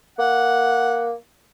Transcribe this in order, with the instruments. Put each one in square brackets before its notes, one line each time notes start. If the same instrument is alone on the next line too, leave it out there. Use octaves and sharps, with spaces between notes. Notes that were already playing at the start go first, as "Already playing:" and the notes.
[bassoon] A#3 [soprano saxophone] F#5